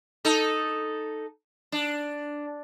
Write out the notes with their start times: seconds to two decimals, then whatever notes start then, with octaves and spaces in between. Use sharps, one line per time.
0.25 D#4 A4
1.72 D4